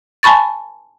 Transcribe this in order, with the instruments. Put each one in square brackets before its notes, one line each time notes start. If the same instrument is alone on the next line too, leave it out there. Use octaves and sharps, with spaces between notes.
[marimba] G#5 A5 B5 C#6 A6